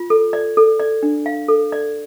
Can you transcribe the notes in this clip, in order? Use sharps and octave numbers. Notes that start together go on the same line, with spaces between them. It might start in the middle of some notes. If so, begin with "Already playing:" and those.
Already playing: F4
A4
D5
A4
D5
D4
F5
A4
D5